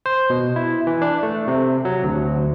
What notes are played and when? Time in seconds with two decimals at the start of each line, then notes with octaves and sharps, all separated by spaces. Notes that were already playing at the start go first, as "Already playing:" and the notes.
0.06 C5
0.30 B2
0.56 E4
0.87 E3
1.02 D4
1.23 A3
1.48 C3
1.85 F#3
2.04 D2